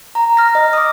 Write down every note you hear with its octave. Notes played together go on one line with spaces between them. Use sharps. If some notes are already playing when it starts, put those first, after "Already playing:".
A#5
F6 A#6
D#5
D6 D#6